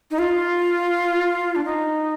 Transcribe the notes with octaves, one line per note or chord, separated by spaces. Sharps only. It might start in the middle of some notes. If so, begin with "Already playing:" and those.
D#4
F4
D4
D#4